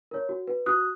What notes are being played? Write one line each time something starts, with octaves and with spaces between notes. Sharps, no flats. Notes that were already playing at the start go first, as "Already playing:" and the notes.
A#4 C#5
F#4
B4
F#4 D#6 F#6